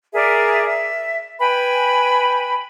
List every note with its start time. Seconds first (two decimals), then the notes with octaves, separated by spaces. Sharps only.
0.13 G#4 A#4 D5 E5
0.67 E5
1.40 B4 G5 G#5 B5